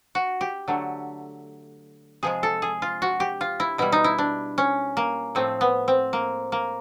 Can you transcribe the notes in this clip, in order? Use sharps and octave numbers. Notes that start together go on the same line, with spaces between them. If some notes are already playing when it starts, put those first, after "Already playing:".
F#4
G4
D3 F#3 A3
C3 F3 G#3 G#4
A4
G#4
F4
F#4
G4
F4
E4
B2 G3 E4
D#4
E4
D4
C#4
A#3
A2 F3 A3 C4
B3
C4
A#3
A#3